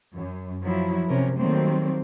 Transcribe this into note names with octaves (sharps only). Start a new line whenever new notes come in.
F#2
F3 F#3 E4
C3 C#4 A#4
D#3 F#3 G3 A3 A#3 C4